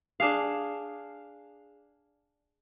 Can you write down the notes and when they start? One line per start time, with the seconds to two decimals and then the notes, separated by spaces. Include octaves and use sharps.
0.20 D4 G#4 F5